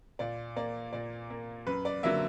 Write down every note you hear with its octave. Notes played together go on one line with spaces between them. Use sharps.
A#2 D5
A#3 D5
A#2 D5
A#3
F#2 B4
D5
D3 F#3 A#3 E5